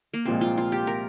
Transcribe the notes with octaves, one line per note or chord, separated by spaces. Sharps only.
A#3
C2 A#2 F3 G#3 C4
F4
F4
G4
A#4